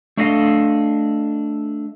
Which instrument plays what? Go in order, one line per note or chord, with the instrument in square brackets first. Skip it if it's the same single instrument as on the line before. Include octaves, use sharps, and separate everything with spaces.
[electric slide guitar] A3 D4 A4 D#5 F5